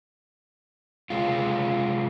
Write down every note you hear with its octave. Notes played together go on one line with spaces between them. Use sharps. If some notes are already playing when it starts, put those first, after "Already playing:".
C3 G#3 F4